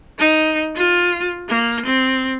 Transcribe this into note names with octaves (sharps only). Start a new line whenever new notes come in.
D#4
F4
A#3
C4